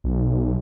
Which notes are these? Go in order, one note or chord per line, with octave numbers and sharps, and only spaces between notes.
B1